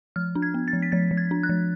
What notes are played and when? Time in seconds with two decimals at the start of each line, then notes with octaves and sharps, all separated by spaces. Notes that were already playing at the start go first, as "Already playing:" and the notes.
0.16 F3 F6
0.36 D4
0.42 G#6
0.54 B3
0.68 A6
0.73 F3
0.82 B6
0.92 F3 A6
1.11 F3
1.17 G#6
1.31 D4
1.43 F#6
1.49 F3